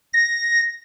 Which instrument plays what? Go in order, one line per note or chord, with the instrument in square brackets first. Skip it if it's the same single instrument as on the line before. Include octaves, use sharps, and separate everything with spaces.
[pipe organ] A#6